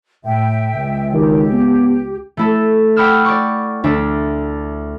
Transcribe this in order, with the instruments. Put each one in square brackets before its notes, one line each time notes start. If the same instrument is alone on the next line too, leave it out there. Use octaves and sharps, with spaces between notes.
[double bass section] A2 [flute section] E5 G5
[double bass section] C#2
[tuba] D#3 [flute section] G4
[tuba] B3
[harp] A3 E4 A4
F#5 G5 B5 D6 E6 F6
D5 C#6
D2 D4 D5 E5